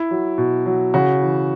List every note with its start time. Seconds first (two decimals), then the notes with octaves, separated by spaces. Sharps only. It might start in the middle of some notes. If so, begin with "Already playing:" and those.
Already playing: E4
0.11 F#3
0.38 B2
0.66 F#3
0.94 C#3 F#4
1.22 E3